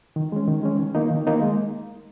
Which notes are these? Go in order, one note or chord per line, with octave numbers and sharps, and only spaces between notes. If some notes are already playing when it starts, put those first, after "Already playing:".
D#3
G#3 C#4
D#3
G#3 C#4
D#3
A#3 D#4
D#3
A#3 D#4
G#3